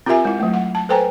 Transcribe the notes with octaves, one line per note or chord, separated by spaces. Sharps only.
C4 F4 G4 A#4 E5 G#5
G#3 E4
F#3 A3
F#5
A5
A4 B4 C5 G5 G#5 A#5